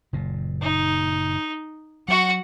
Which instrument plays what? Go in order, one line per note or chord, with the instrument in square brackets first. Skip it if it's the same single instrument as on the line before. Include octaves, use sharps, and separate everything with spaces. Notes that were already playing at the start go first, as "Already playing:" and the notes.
[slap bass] F#1 A#2
[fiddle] D#4
[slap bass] F#3 [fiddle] F#4 F#5